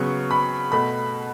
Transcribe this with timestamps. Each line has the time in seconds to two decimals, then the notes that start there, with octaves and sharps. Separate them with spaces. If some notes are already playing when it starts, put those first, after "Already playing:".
Already playing: C#3 F#3 B3 C#6
0.31 B5
0.72 B2 A3 B5